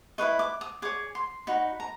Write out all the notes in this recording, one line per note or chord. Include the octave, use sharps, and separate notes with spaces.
E4 G#4 B4 D#5 C#6
D6
D#6
G#4 C#5 D6
C6
D#4 F#4 B5
A#5